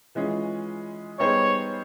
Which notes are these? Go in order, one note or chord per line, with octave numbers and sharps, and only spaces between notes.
E3 G#3 C#4 F4 G#4
G3 B3 D#4 G#4 C5 C#5